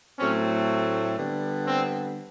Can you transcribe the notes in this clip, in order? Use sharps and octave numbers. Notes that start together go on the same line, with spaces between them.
A2 F#3 A3 C4 C#4
D3 G3 B3
C4